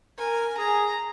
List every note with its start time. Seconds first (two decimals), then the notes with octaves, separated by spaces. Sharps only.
0.18 A#4 G#5
0.58 G#4 A#5